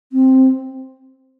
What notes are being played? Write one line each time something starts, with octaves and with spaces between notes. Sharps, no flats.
C4